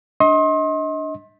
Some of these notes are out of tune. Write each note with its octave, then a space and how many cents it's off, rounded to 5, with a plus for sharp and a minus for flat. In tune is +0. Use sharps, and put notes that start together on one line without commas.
D4 +0 D#5 +30 C6 +35